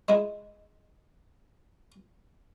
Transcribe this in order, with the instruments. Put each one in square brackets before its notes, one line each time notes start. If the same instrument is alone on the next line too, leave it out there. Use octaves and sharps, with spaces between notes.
[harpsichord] G#3 E4